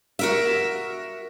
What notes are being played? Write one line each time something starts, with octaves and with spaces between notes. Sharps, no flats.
F#4 A#4 E5